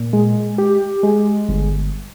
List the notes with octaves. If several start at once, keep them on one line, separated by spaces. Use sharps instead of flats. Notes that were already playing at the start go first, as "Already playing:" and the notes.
Already playing: A#2
G#3
G4
G#3
G1